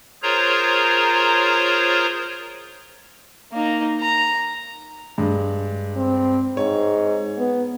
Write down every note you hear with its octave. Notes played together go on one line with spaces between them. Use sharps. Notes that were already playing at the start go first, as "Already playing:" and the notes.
F4 G#4 A#4 C5 C#5 A#5
A#3 D#4
A#5
G2 G#3
C4
G#2 C#5
B3